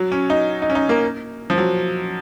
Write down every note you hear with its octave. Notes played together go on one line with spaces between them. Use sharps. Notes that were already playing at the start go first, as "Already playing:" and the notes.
Already playing: F#3
C#4
D#4
D#4
C#4
D#4
A#3
F3
F#3